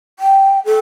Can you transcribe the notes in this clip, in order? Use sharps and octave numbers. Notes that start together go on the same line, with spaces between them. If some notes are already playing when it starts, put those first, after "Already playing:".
G5
A4